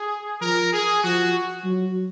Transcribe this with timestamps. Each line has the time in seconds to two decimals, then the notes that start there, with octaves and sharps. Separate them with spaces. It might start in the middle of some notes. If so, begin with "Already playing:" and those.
Already playing: G#4
0.41 F3 A#4
0.73 G#4
1.03 F3 F#4
1.65 F#3